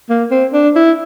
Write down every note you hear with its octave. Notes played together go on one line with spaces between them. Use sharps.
A#3
C4
D4
E4